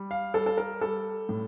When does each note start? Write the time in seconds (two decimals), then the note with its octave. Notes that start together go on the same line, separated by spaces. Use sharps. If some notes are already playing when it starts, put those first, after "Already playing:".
Already playing: G3
0.11 F5
0.34 G3 A4
0.46 A4
0.57 A#4
0.81 G3 A4
1.29 A2